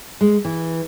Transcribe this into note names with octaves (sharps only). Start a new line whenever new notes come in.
G#3
E3